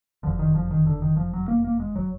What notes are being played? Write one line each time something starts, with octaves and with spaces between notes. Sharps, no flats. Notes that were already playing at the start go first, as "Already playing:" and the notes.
F#1 F2 D3 F3
D#3
F3
D#3
D3
D#3
F3
F#3
A#3
A#3
G#3
F#3